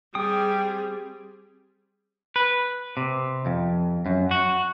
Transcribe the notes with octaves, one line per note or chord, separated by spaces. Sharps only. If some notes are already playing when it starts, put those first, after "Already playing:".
G3 C4 G#4 G5 D#6
B4
C3
F2
F#2
F#4